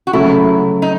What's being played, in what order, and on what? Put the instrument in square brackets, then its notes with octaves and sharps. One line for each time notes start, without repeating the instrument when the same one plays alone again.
[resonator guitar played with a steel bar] F#4
[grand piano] C#3 F#3 A3 [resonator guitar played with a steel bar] E4
[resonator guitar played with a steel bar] D#4